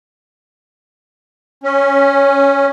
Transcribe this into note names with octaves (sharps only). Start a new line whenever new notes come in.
C#4